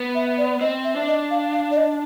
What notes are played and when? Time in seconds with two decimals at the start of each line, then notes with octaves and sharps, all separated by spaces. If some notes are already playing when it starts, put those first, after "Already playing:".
Already playing: B3
0.15 E5
0.38 D5
0.61 C4 D#5
0.84 E5
0.96 D4
1.07 D#5
1.31 F5
1.53 F5
1.71 D5
1.77 D#5